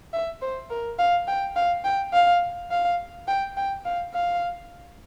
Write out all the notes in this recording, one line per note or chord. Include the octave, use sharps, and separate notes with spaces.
E5
C5
A#4
F5
G5
F5
G5
F5
F5
G5
G5
F5
F5